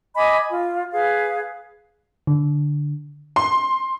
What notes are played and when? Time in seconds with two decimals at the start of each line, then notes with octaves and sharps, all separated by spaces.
0.17 D#5 G#5 B5 D6
0.50 F4
0.92 G#4 B4 F5
2.27 D3
3.36 C6